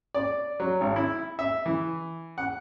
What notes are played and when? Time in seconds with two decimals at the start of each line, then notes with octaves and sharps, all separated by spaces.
0.15 D5
0.60 F#3
0.81 G#1
0.96 E4
1.39 E5
1.66 E3
2.38 F#5